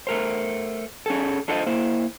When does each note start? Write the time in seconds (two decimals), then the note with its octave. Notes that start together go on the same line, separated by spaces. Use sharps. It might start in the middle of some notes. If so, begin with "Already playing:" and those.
0.07 A3 A#4 C5
1.06 C#4 G#4 A4
1.48 D4 F4 A4 C5 D5 D#5
1.66 A#3 E4 C5